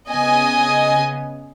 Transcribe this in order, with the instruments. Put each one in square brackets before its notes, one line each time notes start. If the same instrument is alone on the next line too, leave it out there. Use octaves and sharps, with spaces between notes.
[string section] C#3 B3 D#5 G#5